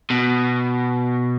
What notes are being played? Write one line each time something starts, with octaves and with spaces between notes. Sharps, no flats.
B2